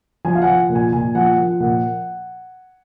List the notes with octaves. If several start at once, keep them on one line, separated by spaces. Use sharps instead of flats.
F3 G#5
F5
F#5
F3
A#2
G#5
A#2 G#5
F3 F#5
F3
A#2 F#5